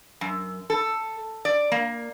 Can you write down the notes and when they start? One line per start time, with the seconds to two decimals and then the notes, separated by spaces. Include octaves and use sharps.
0.21 F#2
0.70 A4
1.45 D5
1.72 A#3